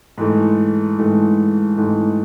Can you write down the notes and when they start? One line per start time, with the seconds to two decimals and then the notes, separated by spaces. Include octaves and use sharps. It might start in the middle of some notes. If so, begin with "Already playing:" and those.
0.18 G#2 E3 A3
0.98 G#2 E3 A3
1.77 G#2 E3 A3